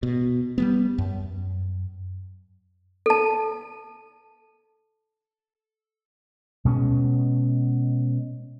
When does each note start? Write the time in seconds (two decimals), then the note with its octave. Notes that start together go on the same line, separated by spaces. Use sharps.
0.03 B2
0.58 G3 G#3 B3
0.98 F#2
3.06 A4 A5
6.65 B2 G#3 C#4